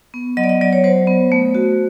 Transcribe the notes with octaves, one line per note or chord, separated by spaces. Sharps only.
B3
F#3 D#5
D5
D#5
F#3 D5
C#5
F#3 C5
B3
A3
F#4